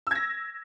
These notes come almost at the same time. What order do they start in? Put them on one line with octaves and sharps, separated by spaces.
E6 G#6 A#6